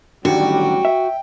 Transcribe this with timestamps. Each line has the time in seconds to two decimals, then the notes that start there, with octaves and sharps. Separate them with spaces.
0.25 A1 D3 D#3 F#3 G3 F#4 G5
0.85 E5